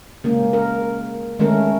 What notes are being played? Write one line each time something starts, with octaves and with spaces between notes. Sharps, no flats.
C#3 G#3 A#3 C#4
A#4
D#3 G#3 A3 C#4 A#4